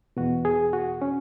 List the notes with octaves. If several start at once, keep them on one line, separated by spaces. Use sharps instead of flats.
E2 B2 F#4
G#4
F#4
C#4